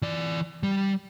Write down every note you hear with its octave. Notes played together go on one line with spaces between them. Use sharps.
E3 D5
G3